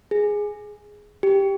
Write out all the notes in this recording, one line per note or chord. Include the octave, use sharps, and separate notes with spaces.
G#4
G4